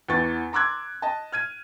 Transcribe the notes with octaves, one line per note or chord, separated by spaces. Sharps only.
E2 E3 C#6 A6
A#5 C6 D6 E6 F#6 G#6
D#5 A5
F6 G#6 D#7